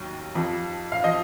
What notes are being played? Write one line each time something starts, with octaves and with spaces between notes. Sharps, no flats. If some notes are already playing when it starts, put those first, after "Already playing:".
Already playing: D#2 D#3 F#3
F2 F3
F5
F3 D#5